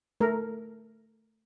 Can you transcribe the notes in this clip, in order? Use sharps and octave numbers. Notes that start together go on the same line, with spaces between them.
A3 A#4